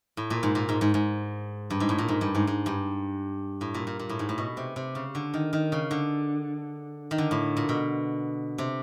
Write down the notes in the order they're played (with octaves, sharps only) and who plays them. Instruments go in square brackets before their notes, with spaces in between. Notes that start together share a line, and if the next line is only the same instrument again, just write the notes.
[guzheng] A2
A#2
G#2
A#2
G#2
G#2
G#2
G2
G#2
A2
A#2
G#2
G2
G#2
G#2
G2
A2
A#2
A#2
A#2
A2
G#2
A2
B2
C3
C3
C#3
D3
D#3
D#3
C#3
D3
D#3
D3
A2
A#2
B2
C3